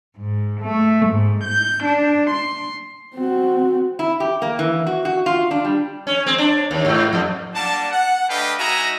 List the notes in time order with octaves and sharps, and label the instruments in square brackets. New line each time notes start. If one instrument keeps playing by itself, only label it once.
[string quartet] G#2
A3
G#2
G6
D4
C6
[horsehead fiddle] C4 F#4
[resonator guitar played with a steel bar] E4
G4
A#3
E3
F#4
F#4
F4
D4
G3
[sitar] C#4
C4
D4
D#2
G#2
F2
[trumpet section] G3 A#3 D4 F#5 A5
F#5
A3 D4 B4 D#5 F5 G5
G#3 D#4 F#4 E5 G#5 A#5